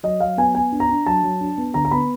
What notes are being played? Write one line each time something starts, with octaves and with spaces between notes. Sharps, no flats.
F#3 D#5
F#3 F5
B3 G#5
B3 G#5
D4
A#5
D4
F#3 A5
F#3
D4
B3
D3 A#5
A#5
B3 B5